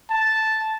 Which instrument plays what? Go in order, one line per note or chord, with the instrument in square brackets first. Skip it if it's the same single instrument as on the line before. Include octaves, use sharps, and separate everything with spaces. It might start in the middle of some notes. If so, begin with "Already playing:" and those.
[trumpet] A5